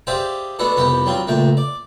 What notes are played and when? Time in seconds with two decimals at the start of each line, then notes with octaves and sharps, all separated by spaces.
0.07 G4 G#4 C5 D5 E5 F5
0.59 G#3 B3 D4 F#4 A4
0.77 C2 F2 B3 G4 B4
1.06 F#3 G3 C4 F4
1.27 C#2 A#2 A3 G5
1.57 D5